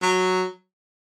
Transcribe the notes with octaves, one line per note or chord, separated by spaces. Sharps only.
F#3